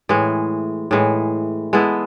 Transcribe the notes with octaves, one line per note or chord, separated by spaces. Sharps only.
A2 E3 G#3
A2 E3 G#3
G#3 B3 E4 A4